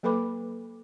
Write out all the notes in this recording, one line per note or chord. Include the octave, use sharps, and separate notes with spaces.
F#3 A#3 A4 B4 B5 D6